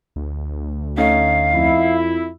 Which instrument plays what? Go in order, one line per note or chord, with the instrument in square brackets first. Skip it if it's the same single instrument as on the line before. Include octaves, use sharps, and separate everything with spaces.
[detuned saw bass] D2
[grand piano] A3 C#4 D#4 [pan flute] F5
[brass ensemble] F2 E4